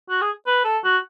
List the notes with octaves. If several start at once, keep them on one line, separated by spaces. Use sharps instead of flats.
F#4
G#4
B4
A4
F#4